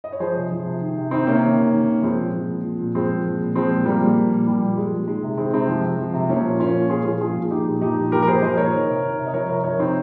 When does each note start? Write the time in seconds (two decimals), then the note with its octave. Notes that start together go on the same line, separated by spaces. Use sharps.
0.04 D#5
0.12 C#5
0.20 F3 G#4 C5
0.36 C3
0.51 F3
0.66 C3
0.81 D#3
0.97 C3
1.11 D#3 C4 D#4
1.27 C3 A#3 C#4
1.43 D#3
1.58 C3
1.73 D#3
1.88 C3
2.03 F3 G#3 C4
2.19 A#2
2.34 F3
2.48 A#2
2.64 F3
2.79 A#2
2.95 F3 G#3 C4
3.10 A#2
3.24 F3
3.41 A#2
3.56 F3 G#3 C4
3.70 A#2
3.85 F3 G3 A#3
4.01 A#2
4.17 F3
4.31 A#2
4.47 F3 G3
4.61 A#2
4.77 F3 G#3
4.92 A#2
5.07 D#3 G#3
5.23 C3
5.37 D#3 G#3 C4
5.53 C3 G#3 C4
5.68 F3
5.84 C3
5.99 F3
6.14 C3
6.29 F3 A#3 C#4
6.44 A#2
6.60 F3 C#4 F4
6.74 A#2
6.90 F3 F4 G#4
7.05 A#2 F4 G#4
7.21 F3 F4 G#4
7.36 A#2
7.45 G#4
7.51 F3 D#4 G4
7.67 A#2
7.81 F3 D#4 G4
7.97 A#2
8.12 F3 G4 A#4
8.22 A#4
8.27 A#2 G#4 C5
8.42 F3 C5 D#5
8.57 A#2 A#4 C#5
8.73 D#3
8.88 C3
9.03 D#3
9.19 C3
9.27 D#5
9.33 F3 A#4 C#5
9.49 C3 A#4 C#5
9.64 F3 A#4 C#5
9.79 C3 C4 D#4